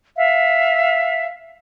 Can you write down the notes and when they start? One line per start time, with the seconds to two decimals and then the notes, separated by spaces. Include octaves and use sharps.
0.16 E5 F5